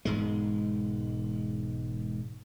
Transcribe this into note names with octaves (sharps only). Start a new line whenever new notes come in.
E1 G#2 G#3